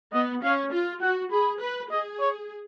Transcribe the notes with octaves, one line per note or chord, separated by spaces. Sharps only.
B3 D#5
C#4 F5
F4
F#4 F#5
G#4 B5
B4
G#4 D#5
C#5